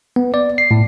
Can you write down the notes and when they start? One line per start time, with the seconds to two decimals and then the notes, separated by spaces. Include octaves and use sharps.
0.16 B3
0.34 D5
0.58 C7
0.71 A2